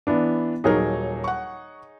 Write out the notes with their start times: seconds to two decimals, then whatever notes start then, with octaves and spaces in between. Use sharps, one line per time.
0.07 E3 B3 D4
0.64 D#1 F#3 D#4 G#4 A#4 C#5
1.24 F#5 C#6